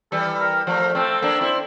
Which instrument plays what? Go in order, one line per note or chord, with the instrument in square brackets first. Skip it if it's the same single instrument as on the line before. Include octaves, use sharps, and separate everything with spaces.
[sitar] E3 G3 [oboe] A4
[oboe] A#4
[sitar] F3 A3 [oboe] A#4
[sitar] A3 C4 [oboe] A4
[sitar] A#3 D4
C4 E4